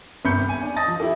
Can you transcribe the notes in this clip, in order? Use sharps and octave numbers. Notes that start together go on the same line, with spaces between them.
G1 C2 B5 G6 C#7
G#5
D4 G#5
D#5 A5 D#6 A6 A#6
F3
E4 G4 A4